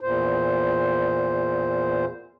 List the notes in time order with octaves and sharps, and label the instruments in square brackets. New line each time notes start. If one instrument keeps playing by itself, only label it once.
[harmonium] E2 A#2 C5